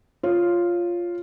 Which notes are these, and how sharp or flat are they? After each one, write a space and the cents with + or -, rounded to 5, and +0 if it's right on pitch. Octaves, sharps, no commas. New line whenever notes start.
F4 +0 C#5 +0